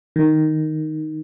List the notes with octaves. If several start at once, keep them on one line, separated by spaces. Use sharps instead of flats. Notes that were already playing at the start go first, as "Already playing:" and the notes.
D#3